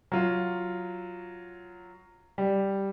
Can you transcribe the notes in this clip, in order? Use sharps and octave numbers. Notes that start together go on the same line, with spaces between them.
F#3 F4
G3